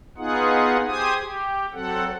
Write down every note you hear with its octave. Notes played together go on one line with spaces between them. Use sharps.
B3 D#4 F4 G#4 F#5
G4 G#4 C5 G#5 D#6
G4
F#3 C4 A4 F#5